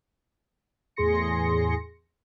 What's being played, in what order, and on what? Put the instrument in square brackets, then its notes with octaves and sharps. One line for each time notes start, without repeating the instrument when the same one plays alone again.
[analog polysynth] E2 A2 G#4 C6 A#6 C#7